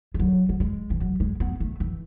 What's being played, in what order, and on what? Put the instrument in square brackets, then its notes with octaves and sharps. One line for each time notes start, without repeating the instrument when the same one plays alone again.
[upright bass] G#3
F#3
F#3
G#3
E3
F#3
G#3
B3
A3
E3